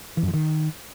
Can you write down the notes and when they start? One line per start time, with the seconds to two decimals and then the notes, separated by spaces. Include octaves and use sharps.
0.17 E3
0.23 F#2
0.28 F3
0.34 D#3